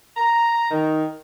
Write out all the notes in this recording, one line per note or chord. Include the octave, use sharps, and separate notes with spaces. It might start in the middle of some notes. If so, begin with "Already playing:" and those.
A#5
D#3